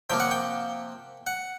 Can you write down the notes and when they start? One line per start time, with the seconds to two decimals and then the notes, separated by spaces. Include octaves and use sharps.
0.10 C3 F3 A#3 G5
0.20 F#5
0.31 G5
1.27 F#5